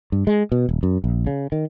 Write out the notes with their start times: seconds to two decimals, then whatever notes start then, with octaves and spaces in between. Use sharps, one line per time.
0.12 G2
0.27 G#3
0.52 B2
0.69 D#1
0.83 F#2
1.04 A#1
1.27 C#3
1.52 D#3